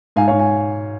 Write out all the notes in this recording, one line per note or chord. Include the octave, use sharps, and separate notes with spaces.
G#2 F5 G#5
G#2 C#5 F5
F5 G#5